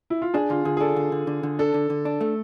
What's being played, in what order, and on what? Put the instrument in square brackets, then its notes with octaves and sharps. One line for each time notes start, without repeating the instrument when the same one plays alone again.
[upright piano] E4
F4
[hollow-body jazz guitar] D4 [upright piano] G#4
[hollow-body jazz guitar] D3 [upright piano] F4
[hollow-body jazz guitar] D3 [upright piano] G#4
[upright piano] G#4
[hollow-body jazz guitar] D4 [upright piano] A4
[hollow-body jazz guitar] D3
D3
D3
D3
[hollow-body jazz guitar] D4 [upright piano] A4
[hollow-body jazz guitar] D3
D3
D4
A3